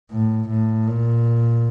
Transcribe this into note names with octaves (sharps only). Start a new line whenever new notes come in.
A2
A2
A#2